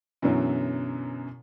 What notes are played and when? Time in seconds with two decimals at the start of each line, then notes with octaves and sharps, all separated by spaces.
0.22 F#2 B2 D3 E3 F#3